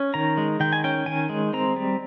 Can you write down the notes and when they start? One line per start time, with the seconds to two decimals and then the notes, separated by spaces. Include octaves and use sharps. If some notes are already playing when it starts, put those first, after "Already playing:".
Already playing: C#4
0.14 D#3 A#5
0.37 G#3
0.60 D#3 G5
0.73 G#5
0.84 C#4 G5
1.06 D#3 G#5
1.29 G#3
1.53 C4 A#5
1.76 G3